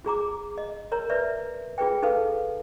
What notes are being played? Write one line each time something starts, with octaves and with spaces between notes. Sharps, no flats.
F4 G#4 A#5 D6
D#5
A#4 C#5 A#5
B4 D5 E5
F4 G#4 B4 G5
D#4 A4 B4 F5